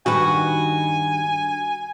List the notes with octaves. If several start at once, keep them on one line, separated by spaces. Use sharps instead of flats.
G2 D#3 F#4 B4 G#5